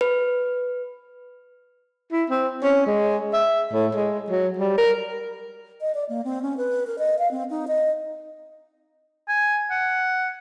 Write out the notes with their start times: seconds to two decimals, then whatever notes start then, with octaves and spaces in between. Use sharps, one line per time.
0.01 B4
2.12 E4
2.30 C4
2.63 C#4
2.87 G#3
3.33 E5
3.73 A2
3.95 G#3
4.30 F#3
4.58 G3
4.78 A#4
5.81 D#5
5.94 D5
6.09 A#3
6.24 C4
6.42 C#4
6.57 B4
6.87 A#4
6.99 D#5
7.19 F5
7.31 C4
7.50 D#4
7.68 D#5
9.28 G#5
9.71 F#5